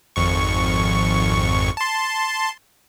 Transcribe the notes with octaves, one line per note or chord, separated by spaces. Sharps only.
G#1 F2 C#6
A5 C6